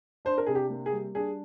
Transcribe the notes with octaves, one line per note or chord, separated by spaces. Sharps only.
D4 C5
A#4
C3 G#4
G4
A#3
G#4
G3
D4 G#4